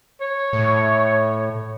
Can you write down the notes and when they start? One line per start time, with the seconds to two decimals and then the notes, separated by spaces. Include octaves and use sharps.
0.22 C#5
0.53 A2